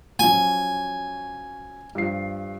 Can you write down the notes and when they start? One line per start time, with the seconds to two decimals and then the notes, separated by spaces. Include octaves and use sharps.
0.19 F3 F#3 C#4 G#5
1.95 G2 F3 C7